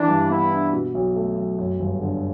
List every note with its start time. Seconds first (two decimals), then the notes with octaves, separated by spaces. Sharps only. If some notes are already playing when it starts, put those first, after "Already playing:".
Already playing: E3 D4
0.08 G2
0.30 B3 E4
0.51 D4
0.73 B2
0.95 B1
1.16 A3
1.37 B1
1.59 F#2
1.80 G1
2.02 D3